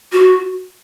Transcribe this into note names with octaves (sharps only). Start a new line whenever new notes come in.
F#4